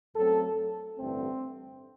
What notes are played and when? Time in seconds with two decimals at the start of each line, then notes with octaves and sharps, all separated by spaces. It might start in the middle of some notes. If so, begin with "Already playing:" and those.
0.15 F#2 F#3 A3 C4 A4
0.98 A1 G2 D3 A3 C4